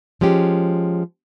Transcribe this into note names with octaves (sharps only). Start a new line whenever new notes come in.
F3 G#3 C#4 G4